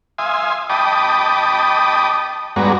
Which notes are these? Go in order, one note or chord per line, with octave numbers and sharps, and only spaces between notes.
E5 F5 G#5 C6 D#6
D#5 G5 A5 B5 D6 D#6
G2 G#3 B3 F#4 D5 A#5